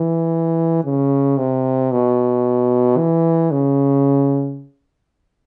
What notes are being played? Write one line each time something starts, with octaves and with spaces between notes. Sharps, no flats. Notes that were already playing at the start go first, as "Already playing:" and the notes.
Already playing: E3
C#3
C3
B2
E3
C#3